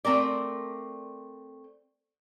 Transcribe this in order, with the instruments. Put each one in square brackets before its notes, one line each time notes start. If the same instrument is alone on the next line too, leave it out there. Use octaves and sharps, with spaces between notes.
[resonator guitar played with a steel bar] A3 C4 A#4 D5